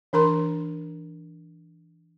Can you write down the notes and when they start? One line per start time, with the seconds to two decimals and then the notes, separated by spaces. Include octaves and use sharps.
0.13 E3 D4 A#4 A#5 C6